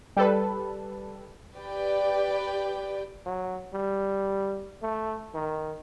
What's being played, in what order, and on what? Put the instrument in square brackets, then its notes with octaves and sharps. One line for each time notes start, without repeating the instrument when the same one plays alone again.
[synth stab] G3 A4 B4
[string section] G4 B4 D5 G5
[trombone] F#3
G3
A3
D#3